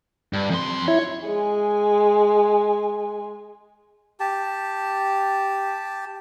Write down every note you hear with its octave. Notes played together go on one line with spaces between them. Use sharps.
G2
F2 C6
E4 C#5
G#3 G#5
G4 A5